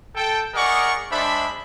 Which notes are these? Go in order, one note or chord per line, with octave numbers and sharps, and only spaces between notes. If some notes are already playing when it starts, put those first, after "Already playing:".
A4 G5
G#4 A#4 D5 D#5 F#5 C#6
G#3 D4 C5 E5 A5 B5